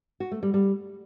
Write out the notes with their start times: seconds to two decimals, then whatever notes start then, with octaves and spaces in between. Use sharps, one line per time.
0.20 F#4
0.31 A3
0.43 G3
0.54 G3